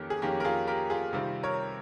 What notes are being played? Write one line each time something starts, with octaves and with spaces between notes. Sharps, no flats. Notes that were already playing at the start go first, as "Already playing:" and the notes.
Already playing: F2 D#3 A#3 C#4 G4
G#4
F2 D#3 A#3 C#4 G4
A#4
F4 G#4
G4 A#4
F4 G#4
C3 D#3 G3 C4 F4
A#4 C#5